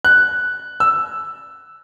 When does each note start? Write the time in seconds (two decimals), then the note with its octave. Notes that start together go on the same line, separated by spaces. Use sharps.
0.05 F#6
0.80 E6